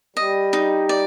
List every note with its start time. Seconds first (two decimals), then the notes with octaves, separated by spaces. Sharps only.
0.16 G3 D#5
0.53 D#4
0.89 D5